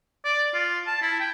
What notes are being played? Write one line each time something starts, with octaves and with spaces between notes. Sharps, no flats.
D5
F4
A5
E4
G5